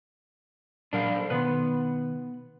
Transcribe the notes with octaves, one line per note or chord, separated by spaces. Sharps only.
A#2 F#3 D4 A#4 F5
A4 C5
B2 D#3 B3 B4 C6